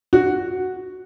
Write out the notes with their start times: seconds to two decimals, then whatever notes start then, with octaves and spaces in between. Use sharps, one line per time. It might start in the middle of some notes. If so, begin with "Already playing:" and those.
0.13 F#4